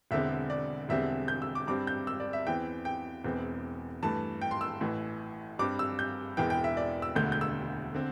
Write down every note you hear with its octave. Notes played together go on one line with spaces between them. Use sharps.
E1 E2 D3 C4 E5
D5
E1 E2 D3 G3 C4 E5
G6
E6
D6
G2 G3 C4 D6
G6
E6
D5
E5
E2 E3 C4 G5
G5
E1 E2 E3 C4
G2 E3 A3 A5
G5
C6
E6
A1 A2 E3
G2 G3 C4 D6
E6
G6
E1 E2 E3 G5
G5
E5
D5
E6
E1 D2 D3 A3 G6
G6
E6
D3 C4